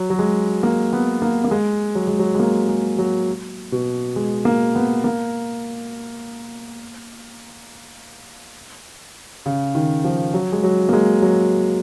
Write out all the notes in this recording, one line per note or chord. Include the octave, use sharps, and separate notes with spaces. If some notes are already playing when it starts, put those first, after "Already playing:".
Already playing: F#3
F#3
G#3
A#3
B3
A#3
A#3
G#3
F#3
G#3
F#3
G#3
A#3
G#3
F#3
B2
G#3
A#3
B3
A#3
C#3
D#3
F3
F#3
G#3
F#3
A#3
G#3
F#3